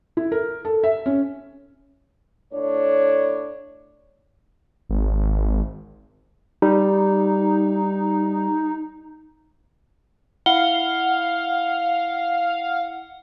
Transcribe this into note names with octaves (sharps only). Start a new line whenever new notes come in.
E4
A#4
A4
E5
C#4
A2 D4 C#5
G#1
G3 D#4
E4 F5 F#5 G7